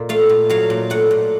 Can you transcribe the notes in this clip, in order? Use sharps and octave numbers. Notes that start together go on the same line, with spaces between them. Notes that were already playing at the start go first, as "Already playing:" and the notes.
Already playing: A#2
A3 F5
A#2
F#3 F5
A#2
A3 F#5
A#2